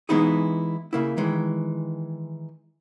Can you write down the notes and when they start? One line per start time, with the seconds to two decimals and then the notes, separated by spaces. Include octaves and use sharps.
0.09 E3 G#3 B3 D#4 E4 G#4
0.93 C#3 A#3 E4
1.17 D#3 E3 G#3